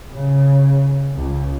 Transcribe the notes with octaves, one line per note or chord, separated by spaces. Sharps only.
C#3
C#2